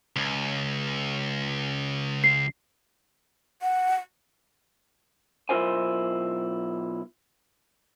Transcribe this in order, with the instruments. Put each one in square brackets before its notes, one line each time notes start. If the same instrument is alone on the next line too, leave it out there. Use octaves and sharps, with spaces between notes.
[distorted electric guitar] C#2
[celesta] C7
[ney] F#5
[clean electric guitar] B1 E4 F4 A#4 C5 G#5